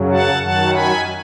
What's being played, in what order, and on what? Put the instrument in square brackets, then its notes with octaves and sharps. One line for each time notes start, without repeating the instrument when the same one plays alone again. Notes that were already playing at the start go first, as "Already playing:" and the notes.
Already playing: [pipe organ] F#2 C#3 F#3
F#5 A5
F#2 D#3 F#3 F#5 A5
G#5 B5